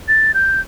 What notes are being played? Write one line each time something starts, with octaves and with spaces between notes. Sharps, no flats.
A6
G6